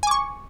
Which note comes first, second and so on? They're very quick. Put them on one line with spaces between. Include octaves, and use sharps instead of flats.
G#5 D6 C#6